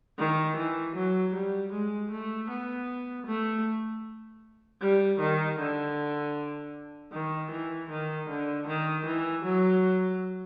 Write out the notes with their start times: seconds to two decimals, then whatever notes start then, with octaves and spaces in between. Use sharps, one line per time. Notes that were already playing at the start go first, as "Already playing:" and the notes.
0.18 D#3
0.57 E3
0.95 F#3
1.34 G3
1.72 G#3
2.11 A3
2.49 B3
3.27 A3
4.81 G3
5.20 D#3
5.59 D3
7.13 D#3
7.51 E3
7.90 D#3
8.29 D3
8.67 D#3
9.06 E3
9.44 F#3